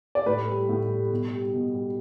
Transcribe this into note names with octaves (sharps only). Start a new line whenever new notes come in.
D5
A2 B4
G3
A2
G3
B2
G3
B2
G3